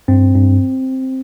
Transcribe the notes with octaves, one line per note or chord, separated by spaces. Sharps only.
G2 C4
G2